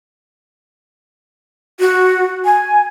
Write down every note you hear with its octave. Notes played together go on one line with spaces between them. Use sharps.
F#4
G#5